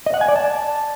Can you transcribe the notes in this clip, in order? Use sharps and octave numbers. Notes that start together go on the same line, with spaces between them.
D#5
F#5
G#5
D5
A5